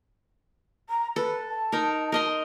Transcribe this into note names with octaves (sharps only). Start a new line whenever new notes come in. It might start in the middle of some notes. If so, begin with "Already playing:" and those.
A#5
A4 B4
A5
D#4 A#4
A#4 D#5 C6